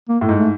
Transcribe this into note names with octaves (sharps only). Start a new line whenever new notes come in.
A#3
A2
G#2
A3